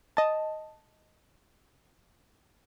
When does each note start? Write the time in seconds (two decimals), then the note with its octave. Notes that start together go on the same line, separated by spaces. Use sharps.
0.17 D#5 A5